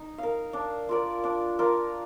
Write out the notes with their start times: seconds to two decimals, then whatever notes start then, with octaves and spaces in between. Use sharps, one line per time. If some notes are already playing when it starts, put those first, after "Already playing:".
Already playing: D#4
0.18 A#4 F5
0.53 D4
0.89 F4 A#4 D5
1.24 D4
1.59 F4 A#4 D5